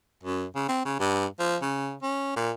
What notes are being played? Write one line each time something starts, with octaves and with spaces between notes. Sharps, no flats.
F#2
C#3
C4
C#3
G2
F3
C#3
C#4
A#2